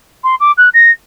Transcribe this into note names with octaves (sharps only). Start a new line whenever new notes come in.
C6
D6
F#6
A#6